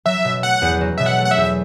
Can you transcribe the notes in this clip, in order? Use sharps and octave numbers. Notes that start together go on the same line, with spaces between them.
F#3 E5
B2
A3 F#5
E2
F#3
B2 E5
F#5
A3
F#5
E5
E2